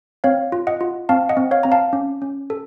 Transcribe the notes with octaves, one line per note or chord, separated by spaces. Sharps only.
C4 C#5 F5
F4
D#5 F#5
F4
C4 F5 A5
D#5 F#5
C4
C#5 F5
C4 A#5
F5 A5
C#4
C#4
A4